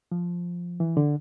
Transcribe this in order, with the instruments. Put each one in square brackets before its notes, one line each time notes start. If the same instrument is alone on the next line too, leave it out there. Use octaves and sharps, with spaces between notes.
[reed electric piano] F3
E3
D3